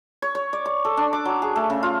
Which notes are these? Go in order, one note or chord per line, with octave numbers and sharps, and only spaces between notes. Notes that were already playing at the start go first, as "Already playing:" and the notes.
C#5
C#5
D5
C#6
A4
D4
D6
F#3
G#4
A3
C#3
F4